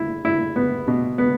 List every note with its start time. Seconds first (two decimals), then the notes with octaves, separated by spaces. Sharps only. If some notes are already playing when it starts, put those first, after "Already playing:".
Already playing: E4
0.25 E4
0.56 B3
0.88 B2
1.18 B3